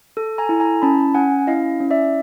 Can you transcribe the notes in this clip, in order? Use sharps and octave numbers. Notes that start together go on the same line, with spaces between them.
A4
G#5 A#5
E4
G#5 A#5
C#4 A5 B5
C#4 F#5 G#5
E4 D#5 F5
C#4
D5 E5